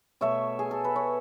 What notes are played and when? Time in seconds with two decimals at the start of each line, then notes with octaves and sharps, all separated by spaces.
0.21 B2 A3 C#5 E5
0.59 G#4
0.71 A4
0.84 B4
0.96 C#5